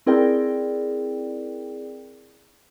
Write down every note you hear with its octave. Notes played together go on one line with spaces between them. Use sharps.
C4 E4 G#4 A#4 D5 G5